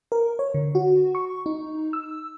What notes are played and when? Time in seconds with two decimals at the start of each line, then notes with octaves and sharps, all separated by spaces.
0.12 A#4
0.39 C#5
0.54 D3
0.75 F#4
1.15 C#6
1.46 D#4
1.93 E6